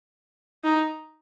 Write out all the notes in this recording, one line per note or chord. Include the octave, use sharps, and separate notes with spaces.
D#4